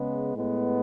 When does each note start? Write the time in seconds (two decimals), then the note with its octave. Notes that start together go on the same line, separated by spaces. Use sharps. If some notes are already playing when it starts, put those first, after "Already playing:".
Already playing: C#3 G#3 B3
0.35 A2 G#3 B3